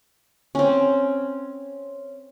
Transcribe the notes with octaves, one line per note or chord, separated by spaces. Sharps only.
C4 C#4